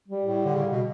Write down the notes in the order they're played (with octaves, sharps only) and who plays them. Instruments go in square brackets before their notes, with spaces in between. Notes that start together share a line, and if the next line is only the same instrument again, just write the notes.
[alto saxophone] G3
[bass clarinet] A2
D3
C#3
B2